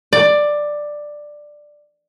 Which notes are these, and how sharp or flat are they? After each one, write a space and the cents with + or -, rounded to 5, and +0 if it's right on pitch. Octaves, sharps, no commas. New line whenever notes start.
D5 +10